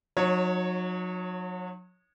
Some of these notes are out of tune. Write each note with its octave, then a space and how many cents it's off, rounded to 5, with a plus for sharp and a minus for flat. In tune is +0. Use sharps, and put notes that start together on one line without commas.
F#3 -35 D#4 -20 C#5 +0